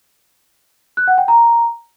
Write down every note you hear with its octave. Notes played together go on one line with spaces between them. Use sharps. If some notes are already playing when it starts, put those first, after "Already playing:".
F#6
F#5
G5
A#5